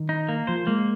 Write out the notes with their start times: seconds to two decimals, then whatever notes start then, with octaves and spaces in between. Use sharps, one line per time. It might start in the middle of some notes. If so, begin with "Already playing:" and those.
Already playing: D#3
0.09 D#4
0.29 A#3
0.47 F3 C5
0.67 G#3 A#3